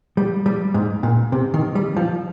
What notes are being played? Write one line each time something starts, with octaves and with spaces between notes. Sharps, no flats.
G3
G3
G#2
A#2
C3
D#3
G3
F3